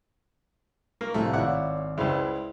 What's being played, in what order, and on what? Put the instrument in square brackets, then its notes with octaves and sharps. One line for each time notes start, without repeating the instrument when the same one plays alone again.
[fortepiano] A#3 [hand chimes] A#5 C#6
[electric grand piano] C2 A2 F3 [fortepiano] A3 [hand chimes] E5 F5 F#6
[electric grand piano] G#1 F5 [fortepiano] E4 F#5 [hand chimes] C#5 D5 D6
[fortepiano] C#2 C#3 [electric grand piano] E4 C5 D5 [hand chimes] E5 C6